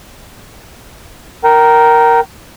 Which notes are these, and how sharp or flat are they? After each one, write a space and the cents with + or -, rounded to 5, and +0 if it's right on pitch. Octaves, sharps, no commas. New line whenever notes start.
A#4 +0 G5 -30